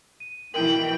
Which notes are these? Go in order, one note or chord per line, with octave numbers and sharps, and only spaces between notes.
D#7
B2 E3 F3 E4 A#4 G5 F#7